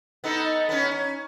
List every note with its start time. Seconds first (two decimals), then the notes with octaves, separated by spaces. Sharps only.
0.24 B3 D#4 A4
0.69 B3 C#4
0.91 C#4